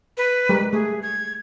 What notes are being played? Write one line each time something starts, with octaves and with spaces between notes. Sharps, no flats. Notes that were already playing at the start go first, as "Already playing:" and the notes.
B4
G3 G#3 A#4
A3 G#4
G#6